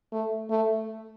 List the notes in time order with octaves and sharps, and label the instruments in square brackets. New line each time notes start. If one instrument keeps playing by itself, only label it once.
[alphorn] A3
A3